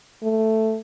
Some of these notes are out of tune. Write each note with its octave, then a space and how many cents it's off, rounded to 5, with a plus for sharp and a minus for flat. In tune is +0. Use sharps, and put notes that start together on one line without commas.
A3 +5